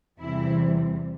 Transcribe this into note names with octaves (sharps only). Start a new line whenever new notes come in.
E2 C3 E3 G3 E4